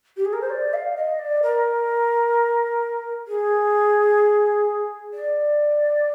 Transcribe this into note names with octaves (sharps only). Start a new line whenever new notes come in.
G4
G#4
A#4
C5
D5
F5
D#5
D5
A#4
G#4
D5